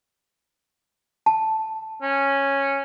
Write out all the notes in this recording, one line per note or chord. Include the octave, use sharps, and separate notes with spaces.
A5
C#4